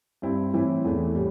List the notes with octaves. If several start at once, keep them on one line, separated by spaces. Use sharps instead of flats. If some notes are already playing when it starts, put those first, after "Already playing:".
G2 G3 C4 E4
A2 E3 C4 E4
E2 E3 A3
A2 G3